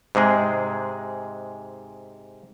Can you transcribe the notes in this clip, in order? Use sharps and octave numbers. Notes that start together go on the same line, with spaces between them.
G#2 C3 G#3 G#4